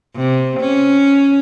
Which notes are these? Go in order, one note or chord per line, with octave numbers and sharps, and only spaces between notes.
C3
C#4